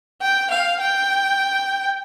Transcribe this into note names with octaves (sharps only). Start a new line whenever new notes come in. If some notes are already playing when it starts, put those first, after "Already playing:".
G5
F5
G5